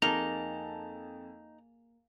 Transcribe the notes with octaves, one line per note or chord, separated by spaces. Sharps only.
F2 A#3 D#4 G#4 A#4 A5 F7